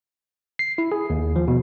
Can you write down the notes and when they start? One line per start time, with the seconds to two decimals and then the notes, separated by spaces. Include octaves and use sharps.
0.59 C7
0.78 E4
0.92 G#4
1.10 D#2
1.36 F3
1.48 B2